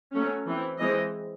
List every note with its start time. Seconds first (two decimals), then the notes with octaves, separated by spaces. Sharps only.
0.13 F#3 A3 C#4
0.46 E3 C4
0.79 E3 G#3 C4 D#5